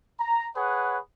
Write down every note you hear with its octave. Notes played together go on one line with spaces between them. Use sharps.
A#5
G#4 B4 C#5 F#5